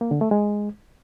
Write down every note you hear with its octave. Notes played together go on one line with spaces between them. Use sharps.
A#3
D3
A3
G#3